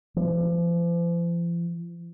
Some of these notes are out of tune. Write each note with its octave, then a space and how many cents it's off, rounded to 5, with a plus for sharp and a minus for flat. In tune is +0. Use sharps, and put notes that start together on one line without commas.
F3 -40